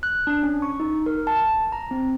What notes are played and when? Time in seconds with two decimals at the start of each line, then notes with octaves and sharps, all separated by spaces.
0.03 F#6
0.27 D4
0.43 C#4
0.62 C#6
0.80 D#4
1.06 A#4
1.27 A5
1.72 A#5
1.91 C4